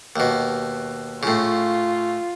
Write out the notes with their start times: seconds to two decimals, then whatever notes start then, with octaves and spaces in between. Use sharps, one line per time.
0.16 D#2 B2
1.23 A2 C#3 F4